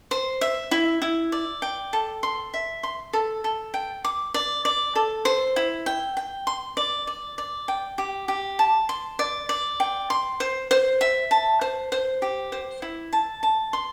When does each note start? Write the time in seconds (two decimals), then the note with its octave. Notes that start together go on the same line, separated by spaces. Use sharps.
0.11 C5
0.41 E5
0.71 E4
1.02 E4
1.32 D5
1.62 G5
1.93 A4
2.23 C6
2.54 E5
2.83 C6
3.13 A4
3.44 A4
3.74 G5
4.04 D6
4.34 D5
4.65 D5
4.95 A4
5.25 C5
5.56 E4
5.86 G5
6.17 G5
6.47 C6
6.77 D5
7.07 D5
7.38 D5
7.68 G5
7.98 G4
8.28 G4
8.59 A5
8.89 C6
9.19 D5
9.49 D5
9.80 G5
10.10 C6
10.40 C5
10.71 C5
11.01 E5
11.31 A5
11.61 C5
11.92 C5
12.22 G4
12.52 C5
12.82 E4
13.13 A5
13.43 A5
13.73 C6